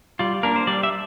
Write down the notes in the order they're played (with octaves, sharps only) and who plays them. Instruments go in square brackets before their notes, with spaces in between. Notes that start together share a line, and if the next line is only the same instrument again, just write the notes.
[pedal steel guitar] G3 F4
A#3 D4 A#4
C5
G3 D5
E5